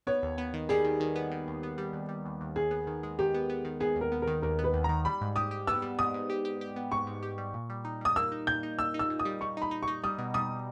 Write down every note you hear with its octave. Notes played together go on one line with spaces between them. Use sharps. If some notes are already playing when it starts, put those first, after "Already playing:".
B3 C#5
D#2
B3
D#3
G3 G#4
D#3
D#3
B3
D#3
D#2
B3
G3
D#2
G3
D#2
D#2
D#2 G#4
B3
D#3
G#3
D#3 G4
B3
B3
D#3
B3 G#4
D#2
A#4
B3
A#4
D#3
D#2 A#4
B3
B4
D#2
D#3 A#5
G3 B5
G#2
G4 D#6
G4
B3 E6
G3
G#2 D#6
G#2
G4
G4
G4
B3
G#2 C#6
G#2
G4
G3
A#2
G3
D#4
G3 D#6
A#3 E6
D#4
A#2 G6
D#4
A#2 E6
D#4
E6
A#2
D#6
G3
G3 C#6
D#4 B5
D#4
C#6
D#4
G3 D#6
B2
G3 D#6